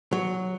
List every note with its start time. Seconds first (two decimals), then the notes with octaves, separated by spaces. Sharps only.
0.13 F#3